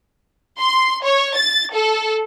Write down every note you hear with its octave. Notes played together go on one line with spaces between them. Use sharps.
C6
C#5
A6
A4